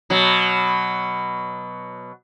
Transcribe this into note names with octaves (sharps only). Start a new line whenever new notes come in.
B2 F#3